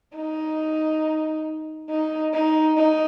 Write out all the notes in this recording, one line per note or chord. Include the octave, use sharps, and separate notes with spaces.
D#4
D#4
D#4
D#4